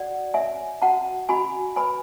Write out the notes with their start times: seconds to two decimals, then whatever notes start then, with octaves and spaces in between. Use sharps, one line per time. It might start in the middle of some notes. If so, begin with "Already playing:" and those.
Already playing: F#4 D5 F#5
0.34 C#5 E5 G#5
0.82 F#4 F#5 A5
1.29 F#4 G#5 B5
1.76 B4 G#5 B5